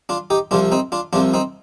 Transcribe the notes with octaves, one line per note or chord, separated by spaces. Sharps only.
D4 F4
D#4 G4
C2 C3 F3 D4 F4
C4 D#4
D4 F4
C2 C3 F3 D4 F4
C4 D#4